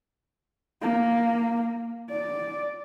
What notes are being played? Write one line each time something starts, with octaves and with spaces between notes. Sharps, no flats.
A#3
D5